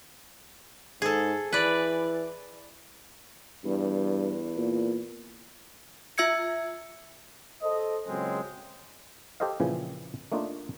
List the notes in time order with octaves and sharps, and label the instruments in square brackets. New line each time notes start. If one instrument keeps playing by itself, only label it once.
[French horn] G#2 [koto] G#4 A4
[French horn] E3 [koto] B4 D5
[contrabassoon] E2 [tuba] G2
[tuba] A#2
[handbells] F4 E5 E6 G#6 C#7
[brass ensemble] A4 C5 D#5
A#2 C#3 F#3 G#3 C4
[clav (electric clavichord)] G4 A4 C5 D#5 F5
A#2 C#3 E3 F3
A3 A#3 D4 D#4 F4